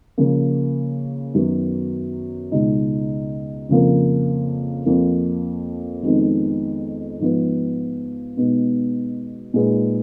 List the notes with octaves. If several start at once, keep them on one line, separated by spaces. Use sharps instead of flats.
C#3 F3 A#3
F#2 D#3 F#3 B3 F#4
C#2 B2 G#3 D#4
F2 C#3 F3 A#3
F2 F3 A#3
F2 D#3 G#3 B3 D#4
G#2 F3 B3
B2 G#3 B3 D#4
A#2 G#3 D#4 G#4 B4